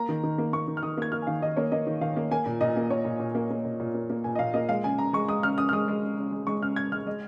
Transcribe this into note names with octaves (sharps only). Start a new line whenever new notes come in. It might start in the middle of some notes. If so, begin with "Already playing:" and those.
Already playing: A#3 A#5
D#3
D#3
A#3
A#3 C#6
D#3
F6
D#3 D#6
A#3 G#6
A#3 F6
G#5
D#3 F5
D#3 D#5
A#3 C#5
A#3 D#5
D#3
D#3 F5
A#3
A#3 G#5
A#2
A#2 D#5
A#3
A#3 C#5
A#2
A#2
A#3
A#3
A#2
A#2
A#3
A#3
A#2 G#5
D#5
A#2 F5
A#3 D#5
G#3 F5
C#3 G#5
C#3 A#5
G#3 C#6
G#3 D#6
C#3 F6
C#3 D#6
F6
G#3 D#6
G#3
C#3
C#3
G#3
G#3 C#6
C#3 F6
C#3 G#6
G#3 F6
G#3 D#5